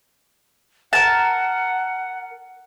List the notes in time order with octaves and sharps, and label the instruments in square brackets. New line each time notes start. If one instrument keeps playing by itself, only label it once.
[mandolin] A#4 A5 [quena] F#5